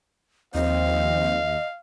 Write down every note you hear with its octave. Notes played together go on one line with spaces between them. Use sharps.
D#2 F3 C4 D#5 F5